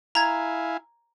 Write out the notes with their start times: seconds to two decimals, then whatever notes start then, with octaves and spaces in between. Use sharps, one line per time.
0.15 E4 F5 G#5 A#5 G#6